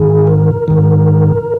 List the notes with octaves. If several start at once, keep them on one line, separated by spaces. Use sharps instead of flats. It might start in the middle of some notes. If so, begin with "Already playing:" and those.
Already playing: G#2 D#3 G#4
A#4
G#2 D#3